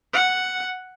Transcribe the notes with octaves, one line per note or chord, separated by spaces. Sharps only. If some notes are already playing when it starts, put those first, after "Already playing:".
F#5